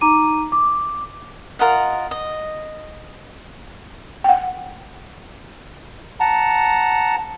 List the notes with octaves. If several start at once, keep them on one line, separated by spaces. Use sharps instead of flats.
D#4 A#5 D6 D#7
D6
F4 A#4 D#5 F#5
D#5
F#5 G5
F#5 A5 A#5